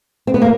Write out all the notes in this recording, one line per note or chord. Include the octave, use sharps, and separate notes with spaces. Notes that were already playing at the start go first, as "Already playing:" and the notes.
C4
B3
A#3